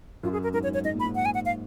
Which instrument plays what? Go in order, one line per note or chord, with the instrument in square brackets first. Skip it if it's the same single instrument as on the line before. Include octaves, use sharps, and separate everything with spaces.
[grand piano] F#2 [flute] F4
[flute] G#4
A#4
[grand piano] G#2 [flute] A#4
[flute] C#5
[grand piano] G#2
[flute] C#5
[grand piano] G#2 [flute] D#5
[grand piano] A#2
[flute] B5
[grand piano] G#2
[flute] F#5
G#5
F#5
F5